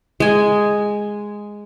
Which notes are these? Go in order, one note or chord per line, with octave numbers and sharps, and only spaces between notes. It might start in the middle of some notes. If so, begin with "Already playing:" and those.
G#3 G#5